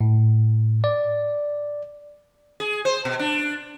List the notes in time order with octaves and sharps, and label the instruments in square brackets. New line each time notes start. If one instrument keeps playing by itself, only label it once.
[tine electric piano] A2
D5
[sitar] G#4
C5
B2
D4